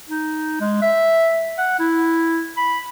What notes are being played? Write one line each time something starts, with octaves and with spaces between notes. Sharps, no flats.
D#4
G#3
E5
F#5
E4
B5